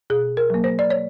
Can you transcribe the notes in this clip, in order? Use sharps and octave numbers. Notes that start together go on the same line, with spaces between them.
B2 G#4
A#4
F#3 A#3
C5
D5
C#5